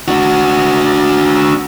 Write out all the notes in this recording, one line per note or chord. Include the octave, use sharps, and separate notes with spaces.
D4 F#4